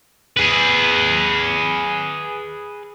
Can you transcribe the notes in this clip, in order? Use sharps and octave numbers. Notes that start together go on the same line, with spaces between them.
G#4 B4